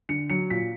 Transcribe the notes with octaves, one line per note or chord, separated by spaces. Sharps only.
D3 C#7
F#3 C#7
A#2 B6